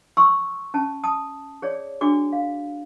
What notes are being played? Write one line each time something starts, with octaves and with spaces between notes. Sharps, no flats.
C6 C#6 E6
C#4 A5
A5 D#6
G#4 C#5 D5
D4 F#4 G#4 D6
F5